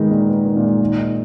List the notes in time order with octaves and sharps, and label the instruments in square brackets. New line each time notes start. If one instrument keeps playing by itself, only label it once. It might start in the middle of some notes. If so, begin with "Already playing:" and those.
Already playing: [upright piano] G#2 [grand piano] D#3 G#3 B3 D#4
[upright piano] A#2 [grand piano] D#4
[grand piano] B3
D#3
[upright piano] A#2
[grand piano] G#3
D#3
D#4